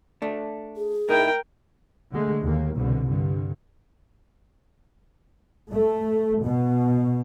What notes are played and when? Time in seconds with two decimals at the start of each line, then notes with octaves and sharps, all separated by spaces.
0.22 A3 D4
0.77 G#4
1.09 A2 D#4 E4 A#4 G5
2.11 D3 G#3 A3
2.43 D#2 A#3
2.78 C2 B2 D3
3.09 G2 D3
5.71 A3
6.43 B2